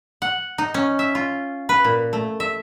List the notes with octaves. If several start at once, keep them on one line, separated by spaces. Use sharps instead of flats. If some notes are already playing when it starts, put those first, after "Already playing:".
F#5
D#4
C#4
E5
F4
B4
A#2
A3
E5